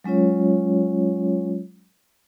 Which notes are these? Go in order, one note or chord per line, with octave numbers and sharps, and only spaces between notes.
F#3 G#3 C#4 F4 C#5